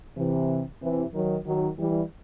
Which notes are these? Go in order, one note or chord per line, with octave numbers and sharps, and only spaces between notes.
C3 E3
C3 E3
D#3 F#3
D#3 F#3
E3 G3